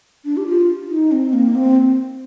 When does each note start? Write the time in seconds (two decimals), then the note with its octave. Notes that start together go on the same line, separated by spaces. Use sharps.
0.25 D4
0.37 G4
0.47 F4
0.90 D#4
1.12 C4
1.33 A#3
1.55 C4